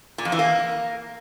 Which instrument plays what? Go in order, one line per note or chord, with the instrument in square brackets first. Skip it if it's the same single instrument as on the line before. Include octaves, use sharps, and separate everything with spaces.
[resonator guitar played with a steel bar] A#2
F2
E3
A#3